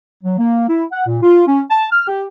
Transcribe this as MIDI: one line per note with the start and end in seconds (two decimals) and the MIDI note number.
0.23 0.37 54
0.38 0.69 58
0.69 0.84 64
0.91 1.03 78
1.07 1.18 46
1.22 1.45 65
1.47 1.61 61
1.70 1.86 81
1.92 2.07 89
2.08 2.23 67